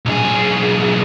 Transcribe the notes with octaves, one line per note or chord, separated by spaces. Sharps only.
B1 G#4